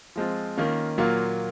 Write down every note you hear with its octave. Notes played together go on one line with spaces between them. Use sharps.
F3 G#3 C4 F4
D#3 A#3 C#4 F4
A#2 F#3 A#3 F4